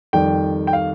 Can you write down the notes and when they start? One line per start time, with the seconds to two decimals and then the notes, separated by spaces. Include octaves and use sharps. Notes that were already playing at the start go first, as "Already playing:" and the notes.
0.13 F2 D#3 G3 G5
0.67 G5
0.73 F5